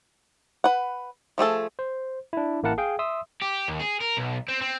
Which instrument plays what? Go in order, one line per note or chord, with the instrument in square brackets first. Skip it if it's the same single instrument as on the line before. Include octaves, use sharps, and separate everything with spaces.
[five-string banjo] B4 F#5
F3 A3 G#4 A4
[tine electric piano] C5
D4 E4
A1 A#3 E4 A#4 F#5 A5
G#4 F5 G5
E5 C6 D#6 E6
[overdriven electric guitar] G4
D#2
G#4
A#4
B1
C4
C4